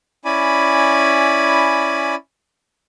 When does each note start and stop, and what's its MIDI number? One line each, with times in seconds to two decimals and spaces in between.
0.25 2.15 61
0.25 2.15 64
0.25 2.15 74
0.25 2.15 80
0.25 2.15 83